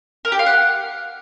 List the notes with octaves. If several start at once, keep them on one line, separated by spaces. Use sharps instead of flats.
A#4
G4
F5
F#5